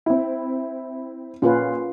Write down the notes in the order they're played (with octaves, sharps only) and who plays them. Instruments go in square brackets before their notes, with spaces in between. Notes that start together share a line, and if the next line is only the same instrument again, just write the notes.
[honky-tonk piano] C4 E4
[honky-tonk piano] A#2 [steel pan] C#4 F4 B4